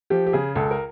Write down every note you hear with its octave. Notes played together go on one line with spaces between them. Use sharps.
F3 G4
G4
C#3 G#4
C#2 A4
A#4